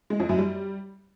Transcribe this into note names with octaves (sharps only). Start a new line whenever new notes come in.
G#3
F2
F#2
G3